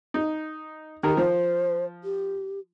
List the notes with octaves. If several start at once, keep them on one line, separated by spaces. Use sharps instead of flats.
D#4
D#3 G4 A#4
F3 C5
G4